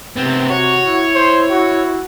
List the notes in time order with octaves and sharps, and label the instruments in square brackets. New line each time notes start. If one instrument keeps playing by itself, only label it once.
[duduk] C3 [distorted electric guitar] B3 C4
[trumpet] F#4 [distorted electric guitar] C#5
[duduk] E4
[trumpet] C5
F#4